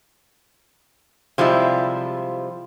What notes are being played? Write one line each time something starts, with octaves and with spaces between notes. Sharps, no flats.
C3 F3 G3 G#3 E4